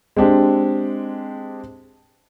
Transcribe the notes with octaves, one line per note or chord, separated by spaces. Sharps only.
G#3 C4 D4 G4